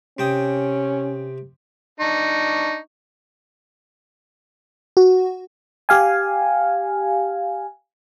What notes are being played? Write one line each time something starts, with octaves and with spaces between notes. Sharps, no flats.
C3 C#4 G5 D#6
D4 D#4 C#6
F#4
G4 F5 G#5